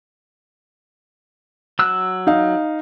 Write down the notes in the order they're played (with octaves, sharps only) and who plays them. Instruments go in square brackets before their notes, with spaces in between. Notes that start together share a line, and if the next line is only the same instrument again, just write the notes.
[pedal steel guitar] F#3 E6 F#6
[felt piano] D#4 F5